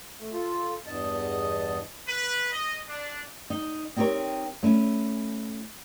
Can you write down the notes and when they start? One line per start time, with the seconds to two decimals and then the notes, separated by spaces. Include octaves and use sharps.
0.19 A3
0.33 F4 A4
0.86 E2 G2 D#5 A5
2.07 B4
2.51 D#5
2.88 D4
3.50 D#4
3.96 C4 D#4 G4 A4 A#4 C#5
4.63 A3 C#4 E4